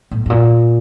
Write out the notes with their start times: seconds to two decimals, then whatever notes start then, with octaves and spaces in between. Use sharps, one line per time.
0.11 A2
0.26 A2
0.30 A#2